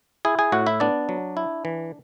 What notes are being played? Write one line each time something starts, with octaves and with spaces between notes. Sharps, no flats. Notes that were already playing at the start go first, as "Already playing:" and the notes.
E4 G#4 G#5
G#4 G#5
A2 F#4 F#5
E4 E5
B3 D4 D5
F#3
E4
E3